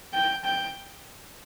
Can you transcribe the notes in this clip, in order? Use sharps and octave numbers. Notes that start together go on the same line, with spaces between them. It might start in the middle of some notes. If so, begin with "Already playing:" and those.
G5
G5